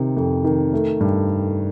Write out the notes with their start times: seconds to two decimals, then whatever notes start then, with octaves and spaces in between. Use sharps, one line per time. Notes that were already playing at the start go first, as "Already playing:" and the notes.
Already playing: C3 D#3
0.17 F2
0.44 D#3
0.73 A3
1.01 G2